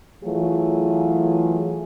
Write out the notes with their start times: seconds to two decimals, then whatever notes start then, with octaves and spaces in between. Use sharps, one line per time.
0.23 E3 F#3 A3 F4 G#4